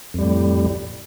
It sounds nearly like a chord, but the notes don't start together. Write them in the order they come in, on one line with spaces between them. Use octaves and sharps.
F2 G3 A2